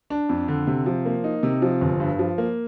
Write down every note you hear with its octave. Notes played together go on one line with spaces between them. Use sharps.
D4
F2
D3
C3
F3
A#3
D#4
C3
F3
G1
G2
F3
A#3